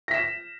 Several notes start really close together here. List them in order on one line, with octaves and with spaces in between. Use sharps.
A#6 B6 E7